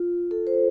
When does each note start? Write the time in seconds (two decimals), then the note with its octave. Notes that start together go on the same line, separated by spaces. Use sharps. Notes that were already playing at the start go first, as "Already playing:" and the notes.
Already playing: F4
0.31 A4
0.47 C5